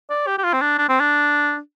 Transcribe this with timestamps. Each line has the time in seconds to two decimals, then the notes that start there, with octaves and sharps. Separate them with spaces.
0.10 D5
0.27 G4
0.38 G4
0.44 F4
0.53 C4
0.61 D4
0.78 D4
0.89 C4
1.00 D4